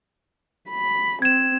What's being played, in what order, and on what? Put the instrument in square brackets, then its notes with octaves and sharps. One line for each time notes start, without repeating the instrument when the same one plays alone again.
[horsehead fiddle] B5
[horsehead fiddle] C4 [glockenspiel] G#6 E7